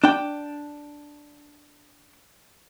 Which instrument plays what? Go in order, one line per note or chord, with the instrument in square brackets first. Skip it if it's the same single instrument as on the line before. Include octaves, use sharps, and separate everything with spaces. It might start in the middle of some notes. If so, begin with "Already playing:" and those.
[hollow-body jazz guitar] D4 G5